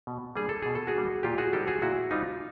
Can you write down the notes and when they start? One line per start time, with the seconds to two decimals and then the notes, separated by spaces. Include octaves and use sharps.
0.07 B2
0.36 G3 A#3 D4 G#4
0.49 A4
0.62 B2 G#4
0.75 A4
0.87 F#4 G#4
0.94 G3 A#3 D4
1.23 A#2 F4 G4
1.38 F#4 G#4
1.53 G3 C4 D#4 G4 A4
1.67 F#4 G#4
1.82 A#2 E4 F#4
2.11 G3 C4 D#4 F4